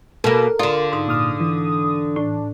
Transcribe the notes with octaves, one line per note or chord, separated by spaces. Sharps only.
B2 A#3 A4 A#4
D3 F4 D5 D#6
G#2 D#4
A#2 D#6 F6
E3
A2 D4